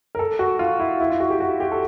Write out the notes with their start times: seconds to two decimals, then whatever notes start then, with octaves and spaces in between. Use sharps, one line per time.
0.15 A#4
0.19 A4
0.39 F#4
0.59 F4
0.80 E4
1.00 E4
1.10 F4
1.20 F#4
1.30 G4
1.40 F#4
1.60 G4
1.72 A4